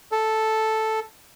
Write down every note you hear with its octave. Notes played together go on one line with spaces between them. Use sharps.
A4